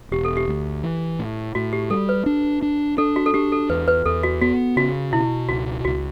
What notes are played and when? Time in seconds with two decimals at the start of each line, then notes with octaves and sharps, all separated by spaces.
0.11 E1 G4
0.25 A4
0.37 G4
0.48 D2
0.83 E3
1.19 A2
1.55 A2 F#4
1.73 G4
1.90 G3 A4
2.09 B4
2.26 D4
2.62 D4
2.98 D4 A4
3.16 F#4
3.26 A4
3.34 D4 G4
3.52 A4
3.69 E2 B4
3.88 B4
4.05 E2 A4
4.23 F#4
4.41 B3 F#4
4.76 C#3 F#4
5.13 B2 E4
5.49 C#2 F#4
5.85 C#2 F#4